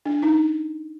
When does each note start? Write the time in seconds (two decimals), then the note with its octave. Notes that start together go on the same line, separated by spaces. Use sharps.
0.06 D4
0.22 D#4